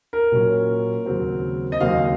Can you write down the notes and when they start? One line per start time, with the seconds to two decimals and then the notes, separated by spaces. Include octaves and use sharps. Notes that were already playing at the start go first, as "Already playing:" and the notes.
0.13 A#4
0.32 A#2 F#3 C#4
1.06 D#2 C#3 F#3 C4
1.72 D#5
1.80 D#2 C#3 F#3 C4 F5